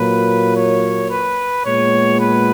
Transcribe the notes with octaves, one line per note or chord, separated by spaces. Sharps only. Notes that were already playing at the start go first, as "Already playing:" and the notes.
Already playing: A#2 F#3 A#3 B4
C#5
B4
A#2 G#3 B3 C#5
B4